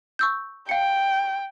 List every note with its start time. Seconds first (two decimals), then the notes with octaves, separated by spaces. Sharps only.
0.19 C#6 E6 G6
0.69 F5 G5 C#7